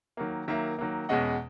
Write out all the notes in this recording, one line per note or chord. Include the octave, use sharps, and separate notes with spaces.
D#3 F#3 A#3
D#3 F#3 A#3 E5
D#3 F#3 A#3
E2 B2 G#3 C#4 D#5 F#5